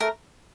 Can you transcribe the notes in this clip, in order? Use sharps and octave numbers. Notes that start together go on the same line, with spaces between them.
A3 A#4